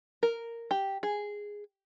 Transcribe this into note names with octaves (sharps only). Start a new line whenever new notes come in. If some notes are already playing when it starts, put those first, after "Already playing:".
A#4
G4
G#4